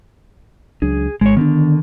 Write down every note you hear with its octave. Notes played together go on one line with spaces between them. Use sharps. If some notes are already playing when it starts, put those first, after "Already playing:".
C#2 F#3 D4 G#4
G#1 G#3 C#5
D3 D#3 B3 D4